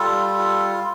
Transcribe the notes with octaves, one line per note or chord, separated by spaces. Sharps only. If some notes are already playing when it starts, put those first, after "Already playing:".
Already playing: G3 F4 A4
F4